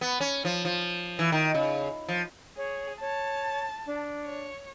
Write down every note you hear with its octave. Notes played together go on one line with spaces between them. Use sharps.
B3
C#4
F3
F3
E3
D#3
C#3
F3
G#4 C#5
C#5 A5
D4
C#5